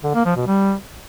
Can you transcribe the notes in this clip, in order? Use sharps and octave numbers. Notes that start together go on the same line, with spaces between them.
D3
A#3
F3
B2
G3